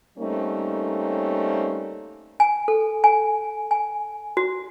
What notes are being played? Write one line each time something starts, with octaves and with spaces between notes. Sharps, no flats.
G3 A3 A#3 C4 C#4 D#4
G#5
A4
G#5
G#5
F#4